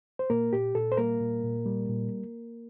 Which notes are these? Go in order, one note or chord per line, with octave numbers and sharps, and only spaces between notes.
C5
A#2 A#3 A#4
A#2 G4
A#2 A4
C5
G3 A#3 A#4
A#2
A#2
G3
A#2